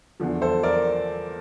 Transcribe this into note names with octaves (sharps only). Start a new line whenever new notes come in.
E2 D3 F3
A4 C5
A#4 D5